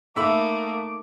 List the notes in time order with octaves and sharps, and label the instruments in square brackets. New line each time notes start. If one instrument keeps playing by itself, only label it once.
[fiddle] A3 A#3 [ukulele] D#4 A4 B5 [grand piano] E5 E6 [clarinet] D6